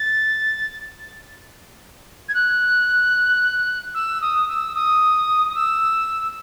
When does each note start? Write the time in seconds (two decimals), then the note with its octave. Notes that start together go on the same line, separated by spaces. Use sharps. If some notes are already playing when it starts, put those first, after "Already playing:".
Already playing: A6
2.29 G#6
2.34 F#6
3.94 E6
4.22 D#6
4.48 E6
4.75 D#6
5.49 D#6
5.55 E6